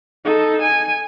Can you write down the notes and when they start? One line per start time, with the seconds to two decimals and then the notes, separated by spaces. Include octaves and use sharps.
0.25 D#4 A4
0.62 G#5